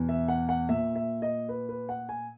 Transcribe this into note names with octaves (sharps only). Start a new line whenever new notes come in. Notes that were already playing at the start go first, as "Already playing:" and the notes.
Already playing: E2 B2
E5
F#5
F#5
A#2 E5
E5
D#5
B4
B4
F#5
G#5